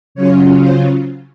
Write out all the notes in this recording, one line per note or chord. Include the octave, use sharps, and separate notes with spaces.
C#3 F#3 C#4 F4 C#5
C5